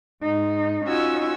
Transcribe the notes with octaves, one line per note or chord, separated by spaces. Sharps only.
G#2 D#4
C#4 D#4 F4 F#4 G#5 E6